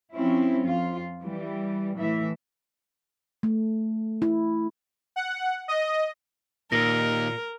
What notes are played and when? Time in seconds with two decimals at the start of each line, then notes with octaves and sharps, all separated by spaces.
0.14 F3 C4 C#4 E4
0.63 F2 F4
1.21 E3 G3
1.96 A2 E3 E5
3.43 A3
4.22 E4
5.16 F#5
5.68 D#5
6.72 D#2 A#2 A#4 A#6